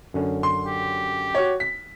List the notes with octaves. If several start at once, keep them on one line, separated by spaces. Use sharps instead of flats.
F#2 D3 C#4
C6
G4
F#4 C#5
B6